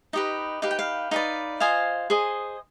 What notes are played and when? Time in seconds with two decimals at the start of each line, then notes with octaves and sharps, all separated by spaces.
0.13 D#4 G4 B4 D#5
0.62 D#4 G4 B4 F5
0.71 G5
0.79 F5
1.11 D#4 B4 D5 F5 G#5
1.60 F4 C5 D#5 F5 G#5
2.10 G#4 C5 D#5